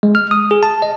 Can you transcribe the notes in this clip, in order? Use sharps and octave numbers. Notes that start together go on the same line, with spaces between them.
G#3
F6
D#6
G#4
A5
D#5